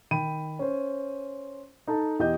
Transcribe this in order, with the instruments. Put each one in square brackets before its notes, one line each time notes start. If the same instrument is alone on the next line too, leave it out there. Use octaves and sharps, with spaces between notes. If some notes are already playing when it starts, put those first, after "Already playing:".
[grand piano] D#3 G5 B5 D#7
C#4 C5
D#4 A4 A5
E2 G4 D#5 G6